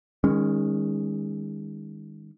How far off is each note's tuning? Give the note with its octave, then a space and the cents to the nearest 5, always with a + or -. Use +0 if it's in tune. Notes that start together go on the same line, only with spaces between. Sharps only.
D#3 +0 G#3 -30 C#4 +0